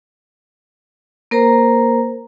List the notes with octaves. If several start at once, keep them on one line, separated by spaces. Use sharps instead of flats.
A#3 A#4 C5 A#5